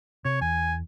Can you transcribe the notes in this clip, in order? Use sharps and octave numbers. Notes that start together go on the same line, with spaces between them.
C3 C#5
E2 G#5